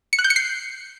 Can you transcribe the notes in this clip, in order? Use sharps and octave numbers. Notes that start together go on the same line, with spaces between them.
C#7
F#6
G6
C#7
C7